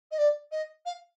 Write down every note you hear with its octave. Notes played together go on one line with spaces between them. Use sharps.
D#5
D5
D#5
F5